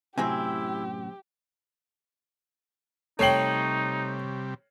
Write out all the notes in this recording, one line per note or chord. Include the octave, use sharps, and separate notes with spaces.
F#2 A2 C3 C4 E4 F#4 G4 G#5
C3 G3 A3 D#4 C#5 G5 C7 F#7